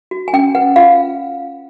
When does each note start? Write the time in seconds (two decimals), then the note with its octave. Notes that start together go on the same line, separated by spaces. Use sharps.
0.11 F#4
0.28 G#5
0.33 C#4 G5
0.55 B4 F#5
0.76 F4 F5